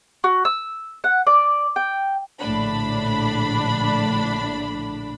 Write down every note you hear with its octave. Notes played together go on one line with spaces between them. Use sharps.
F#4
E6
F#5
D5
G5
A#1 A2 D3 D4 B5